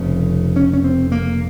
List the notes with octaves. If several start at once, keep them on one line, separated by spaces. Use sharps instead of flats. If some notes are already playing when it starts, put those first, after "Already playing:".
Already playing: F1 F2 C#3 C4
C#4
C#4
C4
A#3